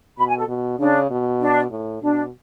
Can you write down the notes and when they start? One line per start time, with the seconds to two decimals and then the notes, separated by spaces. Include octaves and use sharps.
0.18 B2 B5
0.28 G#5
0.38 A4
0.48 B2
0.79 C#3 D4
1.10 B2
1.40 D4
1.71 A2
2.02 B2 D4